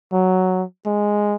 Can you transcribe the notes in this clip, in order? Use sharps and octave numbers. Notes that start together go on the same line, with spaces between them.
F#3
G#3